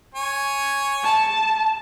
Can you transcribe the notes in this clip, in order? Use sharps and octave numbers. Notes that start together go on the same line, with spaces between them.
C#5 G#5
A5